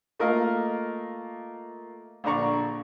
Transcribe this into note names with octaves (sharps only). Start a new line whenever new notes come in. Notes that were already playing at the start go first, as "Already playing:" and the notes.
A3 A#3 F4 A#4 D#5 F5
A#1 D3 D5 A#5 C#6